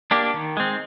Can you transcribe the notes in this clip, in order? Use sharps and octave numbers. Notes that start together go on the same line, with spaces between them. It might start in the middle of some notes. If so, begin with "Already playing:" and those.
A#3 D4 G4
D#3
G#3 C4